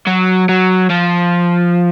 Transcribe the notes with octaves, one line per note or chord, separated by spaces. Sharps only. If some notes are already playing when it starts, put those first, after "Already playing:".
F#3
F#3
F3